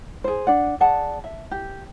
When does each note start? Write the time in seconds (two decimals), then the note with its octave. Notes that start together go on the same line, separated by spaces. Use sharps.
0.24 G#4 C5
0.47 D4 D5 F#5
0.80 G#4 D5 F#5 A5
1.24 E5
1.51 G4